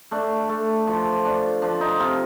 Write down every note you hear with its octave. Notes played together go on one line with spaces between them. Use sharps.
A3 D4
A3
F3
D4
F3 D4
D#4
C3 F4